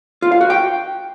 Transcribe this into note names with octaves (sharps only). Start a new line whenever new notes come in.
F4
F5
F#4
G5